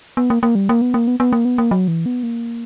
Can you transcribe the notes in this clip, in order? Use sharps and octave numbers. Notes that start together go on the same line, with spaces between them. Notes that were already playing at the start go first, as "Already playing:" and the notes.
B3
A#3
A#3
G3
A#3
B3
A#3
B3
B3
A#3
B3
A#3
F#3
E3
B3
A#3